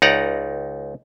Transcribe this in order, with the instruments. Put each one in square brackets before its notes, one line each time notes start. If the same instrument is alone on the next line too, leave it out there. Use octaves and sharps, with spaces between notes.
[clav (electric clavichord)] C#2 D#4 D5 F#5 A#5